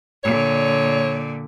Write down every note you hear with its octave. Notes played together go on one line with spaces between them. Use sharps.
A#2 D3 C#5